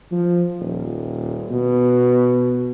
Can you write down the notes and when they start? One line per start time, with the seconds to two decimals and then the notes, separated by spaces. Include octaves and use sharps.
0.11 F3
0.60 D#1
1.51 B2